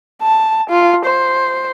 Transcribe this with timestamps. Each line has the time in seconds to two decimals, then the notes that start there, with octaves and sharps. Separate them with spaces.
0.23 A5
0.70 F4
1.06 C5